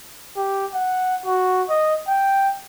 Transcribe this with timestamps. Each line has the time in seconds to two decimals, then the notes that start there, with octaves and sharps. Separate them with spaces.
0.37 G4
0.75 F#5
1.26 F#4
1.69 D#5
2.08 G5